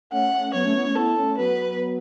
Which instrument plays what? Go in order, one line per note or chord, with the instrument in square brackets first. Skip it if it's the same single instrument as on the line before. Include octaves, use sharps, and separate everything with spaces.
[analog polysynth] A3 C#4 [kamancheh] F#5
[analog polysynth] F#3 B3 [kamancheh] C#5
[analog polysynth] A3 C#4
B3 E4
A3 C#4
[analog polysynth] B3 E4 [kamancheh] A4
[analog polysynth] A3 C#4
[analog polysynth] F#3 B3 [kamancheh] B4